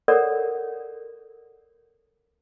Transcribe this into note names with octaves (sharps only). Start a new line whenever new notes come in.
A4 A#4 C#5 D5 F#5